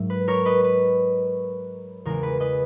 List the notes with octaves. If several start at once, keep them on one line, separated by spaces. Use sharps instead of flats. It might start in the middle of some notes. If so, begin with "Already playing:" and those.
Already playing: G#2 F#3 A#3 E5
B4
A#4 C#5
B4 D#5
B4
E2 C#3 G#3 A#4
B4
B4 D#5